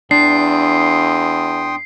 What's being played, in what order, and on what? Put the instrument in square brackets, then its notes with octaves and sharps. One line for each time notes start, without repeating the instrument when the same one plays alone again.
[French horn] E2 [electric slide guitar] D4 [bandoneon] G5 C6 D#6 [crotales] C7